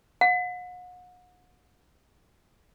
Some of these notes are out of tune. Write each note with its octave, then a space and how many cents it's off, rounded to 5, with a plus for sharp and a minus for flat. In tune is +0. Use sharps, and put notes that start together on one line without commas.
F#5 -40